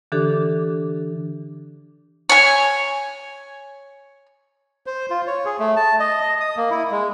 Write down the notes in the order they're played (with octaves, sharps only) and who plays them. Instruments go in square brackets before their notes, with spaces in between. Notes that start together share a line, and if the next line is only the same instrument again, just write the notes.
[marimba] D3 E3 D4 G4 A4 D6
[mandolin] C#5 G#5
[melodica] C5
F4
C#5
G#4
A3
A5
D#5
D#5
D#6
A#3
E4
G#3